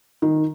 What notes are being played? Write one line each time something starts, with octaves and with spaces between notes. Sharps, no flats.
D#3